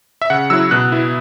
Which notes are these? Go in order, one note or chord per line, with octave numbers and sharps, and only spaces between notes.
E5
C#3 F#5
F#3 E4 E6
B2 F#6
B3 E4